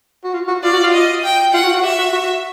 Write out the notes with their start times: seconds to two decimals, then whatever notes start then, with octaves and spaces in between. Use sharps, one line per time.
0.24 F#4
0.33 F4
0.48 F#4
0.63 F4 D5
0.73 F#4
0.84 F4
0.93 D#5
1.24 G5
1.53 F4 F#5
1.63 F#4
1.74 F#4
1.83 G4 E5
1.98 F#4
2.13 F#4